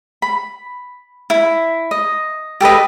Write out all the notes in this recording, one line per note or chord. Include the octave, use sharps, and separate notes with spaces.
B5
E4
D#5
G4 A4 B4 D#5